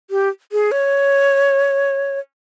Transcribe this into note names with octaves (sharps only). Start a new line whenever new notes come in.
G4
G#4
C#5